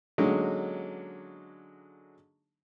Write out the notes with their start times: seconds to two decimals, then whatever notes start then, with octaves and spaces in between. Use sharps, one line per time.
0.18 D3 F#3 G#3 A#3 C#4 D#4